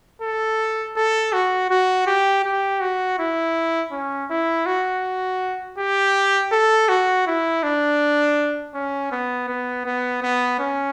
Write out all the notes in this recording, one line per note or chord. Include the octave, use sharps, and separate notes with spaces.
A4
A4
F#4
F#4
G4
G4
F#4
E4
C#4
E4
F#4
G4
A4
F#4
E4
D4
C#4
B3
B3
B3
B3
C#4